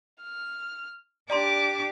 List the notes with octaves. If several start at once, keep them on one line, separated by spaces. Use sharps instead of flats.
F6
D4 G4 D5 A#5 C6 D6